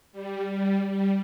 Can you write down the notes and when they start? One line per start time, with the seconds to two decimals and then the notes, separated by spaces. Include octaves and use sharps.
0.13 G3
0.50 G3
0.90 G3